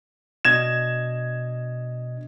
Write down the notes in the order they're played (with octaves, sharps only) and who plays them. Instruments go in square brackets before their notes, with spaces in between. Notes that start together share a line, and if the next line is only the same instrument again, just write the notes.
[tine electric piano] B2 D4 D#5 [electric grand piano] G#6 E7